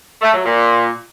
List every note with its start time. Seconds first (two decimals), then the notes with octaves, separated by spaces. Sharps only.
0.21 A3
0.33 F#3
0.45 A#2